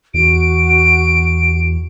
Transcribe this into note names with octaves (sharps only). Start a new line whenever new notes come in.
E2 F#4 D7